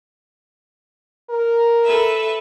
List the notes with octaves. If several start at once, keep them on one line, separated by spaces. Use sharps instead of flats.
A#4
A4 B4 E5